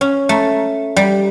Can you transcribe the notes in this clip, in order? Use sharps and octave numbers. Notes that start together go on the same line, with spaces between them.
C#4
A3
G3